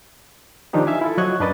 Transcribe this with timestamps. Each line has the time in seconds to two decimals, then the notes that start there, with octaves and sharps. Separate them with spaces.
0.73 D#3 F3 D4 D#4 G4
0.87 E5 F5 G#5
1.01 E4 F4 A4
1.17 F3 F#3 D#5 C#6 F#6 G#6
1.40 F#2 D4 A#4 B4 D#5 A6